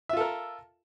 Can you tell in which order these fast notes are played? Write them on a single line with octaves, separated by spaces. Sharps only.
E5 F4 A4 A#4